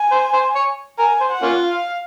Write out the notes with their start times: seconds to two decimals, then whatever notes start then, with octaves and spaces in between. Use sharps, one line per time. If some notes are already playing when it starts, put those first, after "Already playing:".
Already playing: G#5
0.12 C5
0.33 C5
0.55 C#5
0.99 A#4 G#5
1.21 C5
1.31 F#5
1.42 A#3 C#4 F4
1.65 F5